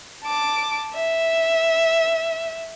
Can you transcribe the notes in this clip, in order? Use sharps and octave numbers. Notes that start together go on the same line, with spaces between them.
A5 D6
E5